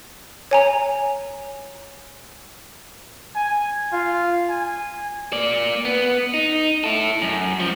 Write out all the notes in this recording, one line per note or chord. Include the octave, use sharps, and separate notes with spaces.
C#5 G#5 A#5
G#5
F4
G#5
A#3 D5
B3
D#4
E4 A4
F#2
G#2 F3